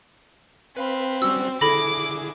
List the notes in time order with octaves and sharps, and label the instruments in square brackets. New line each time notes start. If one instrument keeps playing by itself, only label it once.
[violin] C4 [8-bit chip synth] B4 F5 B5
[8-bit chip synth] G3 C#4 F#4 [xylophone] E6
[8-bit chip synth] D3 E4 G#4 [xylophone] A4 B5 A#6 [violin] D6